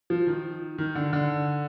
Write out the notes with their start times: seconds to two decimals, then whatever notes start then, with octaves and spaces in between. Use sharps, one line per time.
0.10 F3
0.27 D#3
0.78 D#3
0.95 D3
1.13 D3